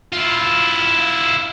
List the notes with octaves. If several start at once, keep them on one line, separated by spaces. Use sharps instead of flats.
E4 F4